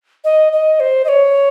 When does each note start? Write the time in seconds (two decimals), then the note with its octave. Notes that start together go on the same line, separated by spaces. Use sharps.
0.24 D#5
0.53 D#5
0.80 C5
1.05 D#5
1.08 C#5